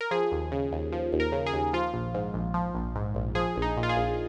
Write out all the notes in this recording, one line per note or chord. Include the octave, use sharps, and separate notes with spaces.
A#4
F3 G#4
D#2
C#3
D#2
F3
D#2
A#4
C#3
G#4
D#2
F3 F4
A#1
G#2
A#1
F3
A#1
G#2
A#1
F3 G#4
A#1
D#4
A#2
F4
G#4
A#1